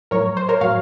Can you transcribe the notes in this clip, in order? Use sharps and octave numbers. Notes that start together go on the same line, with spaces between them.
A2 F#3 A#4 C#5
C5
A#4 C#5
A2 F#3 C#5 F5